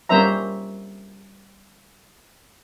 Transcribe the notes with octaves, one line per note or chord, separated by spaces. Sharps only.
G3 A#3 C#4 C5 E5 A#5